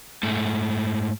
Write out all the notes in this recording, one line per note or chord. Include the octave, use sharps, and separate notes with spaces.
G#2 A3